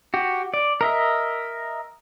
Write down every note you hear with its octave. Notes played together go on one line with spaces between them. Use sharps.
F#4 G4
D5
A#4 D#5 E5